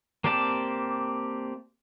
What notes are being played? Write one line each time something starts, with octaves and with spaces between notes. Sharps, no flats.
A#3 C4 G4 D5 A5